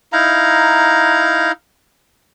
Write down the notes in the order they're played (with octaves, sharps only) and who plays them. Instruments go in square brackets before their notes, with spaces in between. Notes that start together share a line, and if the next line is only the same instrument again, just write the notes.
[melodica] D#4 E4 F5 A#5